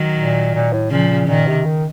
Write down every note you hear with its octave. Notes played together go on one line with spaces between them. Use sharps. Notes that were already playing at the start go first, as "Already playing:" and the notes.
Already playing: D#3 F#3
A#2
A#2
A2
A#2 C#3 F3
A#2 D#3
C3
D#3